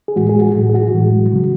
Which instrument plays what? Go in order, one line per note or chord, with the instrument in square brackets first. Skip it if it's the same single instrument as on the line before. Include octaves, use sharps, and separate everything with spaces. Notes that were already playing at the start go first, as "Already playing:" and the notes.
[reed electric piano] G#4
A2 E3 G#3 F#4
G#4
F#4
A2 F#3
G#4
F#4
A2 E3 G#3
C#3 F#3